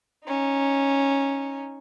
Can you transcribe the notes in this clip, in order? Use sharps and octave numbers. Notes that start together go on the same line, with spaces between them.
C#4 D#4